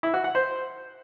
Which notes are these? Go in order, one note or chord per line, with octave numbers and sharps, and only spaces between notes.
E4
F#4
F#5
C5